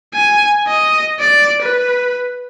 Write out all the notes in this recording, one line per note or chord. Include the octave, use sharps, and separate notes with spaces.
G#5
D#5
D5
B4